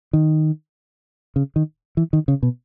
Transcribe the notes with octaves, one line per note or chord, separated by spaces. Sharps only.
D#3
C#3
D#3
E3
D#3
C#3
B2